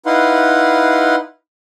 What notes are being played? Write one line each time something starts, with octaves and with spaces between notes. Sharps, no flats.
D#4 E4 B4 F5 F#5 C6